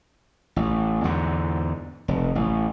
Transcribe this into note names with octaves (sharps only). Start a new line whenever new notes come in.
A1
E2 G#2 D3
F1
A1